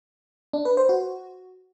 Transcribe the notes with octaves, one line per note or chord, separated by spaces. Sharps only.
D4
B4
C5
F#4